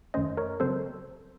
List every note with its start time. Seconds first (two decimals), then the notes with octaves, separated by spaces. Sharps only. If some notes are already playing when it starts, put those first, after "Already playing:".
0.14 F#2 D#3 A3 C#4 C5 D#5
0.37 A#4 C#5
0.60 C#3 F#3 C4 A4 C5